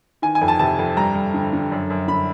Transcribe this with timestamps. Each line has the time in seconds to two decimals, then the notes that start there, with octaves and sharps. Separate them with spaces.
0.22 D#3 G#5
0.35 G#5
0.41 F2
0.48 A5
0.59 C3 A5
0.79 F2
0.97 G2 A#5
1.15 G2
1.34 D3
1.53 D3
1.72 F#2
1.90 F#2
2.08 D3 B5